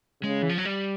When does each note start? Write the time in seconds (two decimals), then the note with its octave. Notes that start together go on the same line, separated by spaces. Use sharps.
0.23 C#3 G#3
0.42 E3
0.49 F3
0.58 F#3
0.65 G3